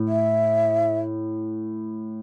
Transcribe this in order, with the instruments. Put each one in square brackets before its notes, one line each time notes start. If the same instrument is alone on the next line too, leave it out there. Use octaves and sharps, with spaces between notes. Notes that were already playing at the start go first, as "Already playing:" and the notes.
Already playing: [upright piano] A2
[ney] E5